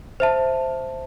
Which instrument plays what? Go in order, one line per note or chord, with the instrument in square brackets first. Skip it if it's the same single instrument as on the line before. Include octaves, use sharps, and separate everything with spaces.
[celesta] C5 E5 A5